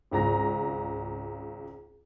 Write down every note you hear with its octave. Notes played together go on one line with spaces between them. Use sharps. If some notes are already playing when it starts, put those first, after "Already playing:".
G#1 C#2 A#5 A#6